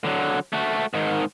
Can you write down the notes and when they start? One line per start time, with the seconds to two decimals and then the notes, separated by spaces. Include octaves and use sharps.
0.04 D3 F#3
0.53 A3 F#4
0.94 G#2 D#3